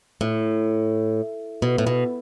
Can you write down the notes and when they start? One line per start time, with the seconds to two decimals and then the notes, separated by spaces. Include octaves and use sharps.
0.21 A2
1.62 B2
1.78 A2
1.87 B2